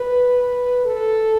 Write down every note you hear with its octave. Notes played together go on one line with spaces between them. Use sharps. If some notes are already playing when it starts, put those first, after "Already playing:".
Already playing: B4
A4